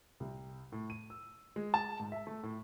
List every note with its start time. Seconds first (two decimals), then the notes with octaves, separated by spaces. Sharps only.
0.20 C2
0.72 A2
0.90 D#7
1.10 E6
1.56 G#3
1.74 A5
2.00 G#2
2.12 E5
2.27 A3
2.43 A2